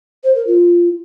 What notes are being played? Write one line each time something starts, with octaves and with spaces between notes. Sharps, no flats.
C5
A#4
F4